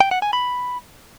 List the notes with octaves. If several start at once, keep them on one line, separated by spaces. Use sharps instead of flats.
G5
F#5
G#5
B5